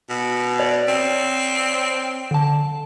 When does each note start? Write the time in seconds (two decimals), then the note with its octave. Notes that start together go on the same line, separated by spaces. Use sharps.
0.10 B2
0.60 C#5 D5
0.88 C4
2.31 D3 A5